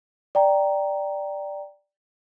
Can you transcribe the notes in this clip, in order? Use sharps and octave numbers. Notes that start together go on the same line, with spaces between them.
D5 G5 A#5